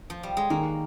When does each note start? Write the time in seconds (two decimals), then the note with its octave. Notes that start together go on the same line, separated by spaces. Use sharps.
0.10 F3
0.23 G3
0.37 G#3
0.50 D#3 A#3